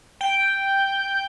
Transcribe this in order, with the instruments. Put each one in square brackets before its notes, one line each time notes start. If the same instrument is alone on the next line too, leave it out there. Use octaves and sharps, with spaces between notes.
[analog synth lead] G5